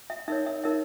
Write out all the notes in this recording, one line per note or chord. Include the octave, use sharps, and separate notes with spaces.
E5
D#4 A#4 C#5 E5
E5
D#4 A#4 C#5 E5